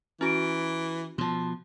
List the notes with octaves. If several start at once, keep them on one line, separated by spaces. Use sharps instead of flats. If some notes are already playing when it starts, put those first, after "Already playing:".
E3 C#4 F#4 A#5 D7
B2 F3 A5 C6